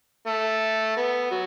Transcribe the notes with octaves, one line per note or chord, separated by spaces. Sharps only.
A3
B3
F#3